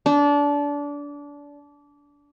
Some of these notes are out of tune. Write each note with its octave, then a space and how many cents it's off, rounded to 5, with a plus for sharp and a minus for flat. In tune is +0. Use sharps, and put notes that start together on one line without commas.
D4 -25